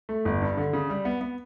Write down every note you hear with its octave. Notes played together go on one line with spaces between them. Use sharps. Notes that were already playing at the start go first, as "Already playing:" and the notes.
A3
G1
G2
D3
C#3
G3
B3
B3